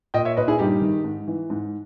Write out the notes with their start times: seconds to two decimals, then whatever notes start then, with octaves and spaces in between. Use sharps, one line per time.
0.14 A#2 D#5 G5
0.25 C#5 E5
0.37 A#2 B4 D#5
0.48 E4 G#4
0.59 G2 D#4 G4
0.81 D#3
1.04 G#2
1.27 E3
1.50 G#2